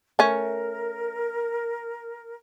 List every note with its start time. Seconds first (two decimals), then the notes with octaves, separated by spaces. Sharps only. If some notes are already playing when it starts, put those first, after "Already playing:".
0.19 A3 C#4 A#4